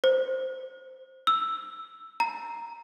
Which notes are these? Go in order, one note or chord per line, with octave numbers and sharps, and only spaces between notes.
C5
E6
A#5